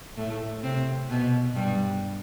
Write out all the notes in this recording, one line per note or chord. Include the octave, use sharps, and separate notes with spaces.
A2 A3
C3 C4
B2 B3
G2 G3